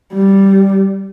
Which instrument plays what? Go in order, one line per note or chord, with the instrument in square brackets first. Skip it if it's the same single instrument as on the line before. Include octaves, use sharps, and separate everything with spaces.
[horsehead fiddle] G3